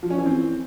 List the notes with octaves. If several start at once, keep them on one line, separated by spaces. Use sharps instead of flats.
F3
C#4
E3
C4